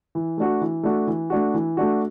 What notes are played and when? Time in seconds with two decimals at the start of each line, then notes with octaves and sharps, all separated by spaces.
0.15 E3
0.38 A3 D4 F#4
0.61 E3
0.83 A3 D4 F#4
1.07 E3
1.30 A3 D4 F#4
1.54 E3
1.77 A3 D4 F#4